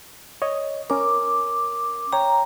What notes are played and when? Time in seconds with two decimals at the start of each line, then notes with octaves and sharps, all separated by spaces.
0.42 C#5 D#5
0.90 C#4 A#4 D6
2.13 C#5 G5 A#5